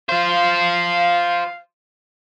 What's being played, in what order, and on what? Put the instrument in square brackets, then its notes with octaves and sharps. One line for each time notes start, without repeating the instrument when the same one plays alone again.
[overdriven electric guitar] F4 C5 [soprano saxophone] F5